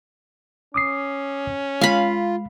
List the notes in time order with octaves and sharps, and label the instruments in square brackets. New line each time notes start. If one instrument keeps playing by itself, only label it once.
[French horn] C#4 [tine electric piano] D6 D#6 C7
[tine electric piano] G#3 [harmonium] F4 [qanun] F5 B5